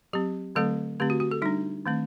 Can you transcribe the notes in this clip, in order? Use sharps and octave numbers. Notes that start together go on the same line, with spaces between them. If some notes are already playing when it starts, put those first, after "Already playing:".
F#3 C4 G4
D3 F#3 A3 C4 A4
D3 A3 C4 G4
F#4
F#4
A4
G3 D4 D#4
D#3 A3 C4